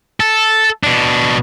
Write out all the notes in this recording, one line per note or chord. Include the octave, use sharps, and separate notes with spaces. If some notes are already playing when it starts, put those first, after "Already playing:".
A4
B2 D4